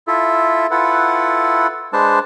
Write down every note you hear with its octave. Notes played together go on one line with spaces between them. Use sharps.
E4 F4 A4 E5
E4 F4 A4 B4 F#5
G#3 D4 B4 C5 A5